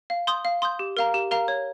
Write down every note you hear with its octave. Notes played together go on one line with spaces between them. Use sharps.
F5
C6 D#6 G6
F5
C6 D#6 G6
G4
A#4 F5 A#5
G4
A#4 F5 A#5
C#5